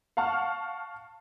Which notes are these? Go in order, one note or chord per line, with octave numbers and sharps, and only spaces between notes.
F5 F#5 A5 C#6 F6